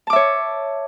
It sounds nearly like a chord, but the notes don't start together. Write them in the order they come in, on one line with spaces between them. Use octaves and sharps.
A5 D6 E5 C#5